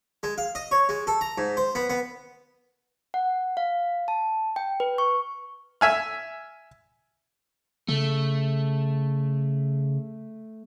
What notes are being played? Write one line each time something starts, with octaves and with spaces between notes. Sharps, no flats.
G#3
F5
D#5
C#5
G#3
A4
A#5
G#2
C5
B3
B3
F#5
F5
A5
G5
B4
C#6
E5 G#5 F6
C#3 A3